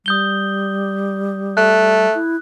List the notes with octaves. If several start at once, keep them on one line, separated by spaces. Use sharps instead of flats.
G3 D#6 G6 G7
A3 F#6
E4